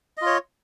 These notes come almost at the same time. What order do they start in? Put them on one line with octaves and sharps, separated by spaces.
D#5 F4 C#5